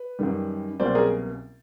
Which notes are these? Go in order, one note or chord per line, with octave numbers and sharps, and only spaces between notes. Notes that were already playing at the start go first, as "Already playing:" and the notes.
Already playing: B4
F#2 D#3 G3
C2 B2 F#3 A#3 C#4 C5 D5
G#4 A#4